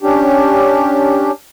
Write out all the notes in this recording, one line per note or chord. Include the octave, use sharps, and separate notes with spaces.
C#4 D4 G4